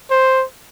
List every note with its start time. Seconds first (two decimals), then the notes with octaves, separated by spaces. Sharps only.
0.11 C5